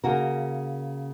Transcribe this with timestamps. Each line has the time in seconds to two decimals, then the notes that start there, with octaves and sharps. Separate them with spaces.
0.04 C#3 A#3 F#4 A#4